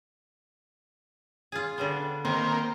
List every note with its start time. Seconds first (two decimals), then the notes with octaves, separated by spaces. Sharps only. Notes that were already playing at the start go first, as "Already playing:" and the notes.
1.52 F4 G#4
1.78 D3 G3 B3
2.25 D#3 A#3 C4